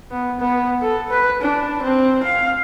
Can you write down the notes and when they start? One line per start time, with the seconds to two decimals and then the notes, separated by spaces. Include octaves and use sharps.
0.11 B3
0.40 B3
0.82 A4
1.10 B4
1.42 D4
1.83 C4
2.23 F5